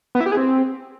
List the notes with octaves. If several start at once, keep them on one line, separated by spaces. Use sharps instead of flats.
B3
E4
G4
G#4
C4